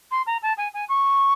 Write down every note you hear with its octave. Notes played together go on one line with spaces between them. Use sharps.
C6
A#5
A5
G#5
G#5
C#6